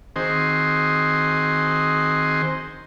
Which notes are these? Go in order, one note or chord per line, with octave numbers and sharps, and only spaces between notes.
D#3 C4 F#4 G#4 C5 D#5